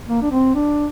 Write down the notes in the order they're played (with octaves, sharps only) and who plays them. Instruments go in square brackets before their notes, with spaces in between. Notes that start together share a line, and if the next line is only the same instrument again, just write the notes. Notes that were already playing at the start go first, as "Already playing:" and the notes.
[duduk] A#3
D4
C4
D4